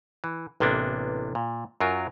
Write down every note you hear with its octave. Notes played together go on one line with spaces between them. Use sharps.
E3
A1 C3 A#3 B3 D4
A#2
F#2 F#3 F4 A#4